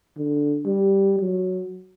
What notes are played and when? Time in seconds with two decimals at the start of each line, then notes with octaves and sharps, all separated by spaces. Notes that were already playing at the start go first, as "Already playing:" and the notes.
0.18 D3
0.66 G3
1.20 F#3